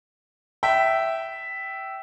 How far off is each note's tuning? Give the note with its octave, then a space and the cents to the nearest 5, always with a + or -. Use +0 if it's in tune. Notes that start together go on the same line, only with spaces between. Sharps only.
E5 +0 G5 -20